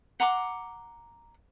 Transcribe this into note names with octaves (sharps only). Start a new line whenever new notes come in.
F#5 A#5 C6 D6